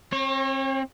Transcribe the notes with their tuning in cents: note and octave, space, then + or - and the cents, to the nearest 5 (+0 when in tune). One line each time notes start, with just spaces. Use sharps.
C4 +35 C#5 -30